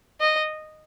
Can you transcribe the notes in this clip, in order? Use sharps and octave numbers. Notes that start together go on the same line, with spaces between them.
D#5